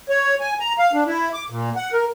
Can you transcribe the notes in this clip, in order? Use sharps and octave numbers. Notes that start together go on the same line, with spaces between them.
C#5
G#5
A#5
F5
D4
E4
D6
A#2
F#5
A#4